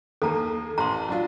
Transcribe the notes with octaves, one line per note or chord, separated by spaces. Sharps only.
D#2 A#3 A4 A#5
A1 A#5 C6
F#3 D4 F4